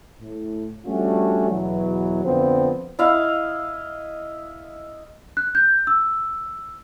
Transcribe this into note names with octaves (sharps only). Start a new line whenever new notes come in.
A2
F3 G3 A3 C#4 D4 F#4
E2 B2 E3 F#3
F2 D3 F3 B3 C4
E4 D#5 F5
F#6
G6
E6